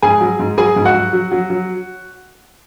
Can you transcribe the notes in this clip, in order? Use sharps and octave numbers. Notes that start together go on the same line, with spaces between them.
G#2 G#4 G#5
F#3
G#2
F#3 G#4 G#5
G#2
F#4 F#5
F#3
F#3
F#3
F#3